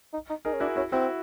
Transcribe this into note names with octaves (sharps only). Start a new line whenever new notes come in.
D#4
D#4
D#4 G#4 A#4
C#4
D4 E4 F#4
C#4 E4 F#4
C4 E4 F#4